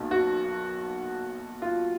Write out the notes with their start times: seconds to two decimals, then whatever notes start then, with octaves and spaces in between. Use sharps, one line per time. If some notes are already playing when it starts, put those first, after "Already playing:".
Already playing: B1 B2 A#3
0.11 F#4
1.62 F4